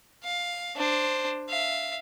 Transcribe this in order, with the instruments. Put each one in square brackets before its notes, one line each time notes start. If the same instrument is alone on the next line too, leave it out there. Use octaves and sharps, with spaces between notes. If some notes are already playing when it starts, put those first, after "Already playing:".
[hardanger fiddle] F5
D4 C5
E5 F5